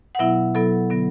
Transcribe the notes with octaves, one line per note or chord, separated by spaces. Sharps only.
F#5
B2 F#3 B3 E4 E5
B2 F#3 B3 E4 A4
D3 F#3 B3